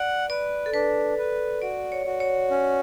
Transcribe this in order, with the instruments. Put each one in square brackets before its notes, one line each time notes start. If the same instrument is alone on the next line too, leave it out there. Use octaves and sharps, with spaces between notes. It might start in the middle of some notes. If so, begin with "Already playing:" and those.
Already playing: [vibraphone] D5 [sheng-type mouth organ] F#5
[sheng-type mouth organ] B4 [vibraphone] D5
[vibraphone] A4
[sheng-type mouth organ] D4 [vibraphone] B4
[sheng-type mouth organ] B4
[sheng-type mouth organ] F#4 [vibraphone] D5
[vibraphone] C#5
[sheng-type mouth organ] F#4
[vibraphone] C#5
[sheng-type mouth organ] C#4